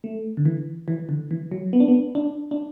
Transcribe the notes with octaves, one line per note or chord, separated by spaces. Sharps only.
A3
D3
E3
E3
D3
E3
F#3
B3
D4
B3
D4
D4